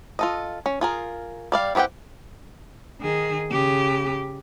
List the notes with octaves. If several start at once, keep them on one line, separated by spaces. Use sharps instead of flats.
F4 A4 D#5
C#4
F4 G#4 A#4
G3 D5 F5
E3 C4 G4 F#5 G5
D#3 G#4
C#3 G4